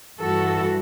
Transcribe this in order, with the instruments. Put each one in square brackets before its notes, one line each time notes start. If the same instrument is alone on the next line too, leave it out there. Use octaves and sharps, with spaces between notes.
[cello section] G2 E3 F#4 A4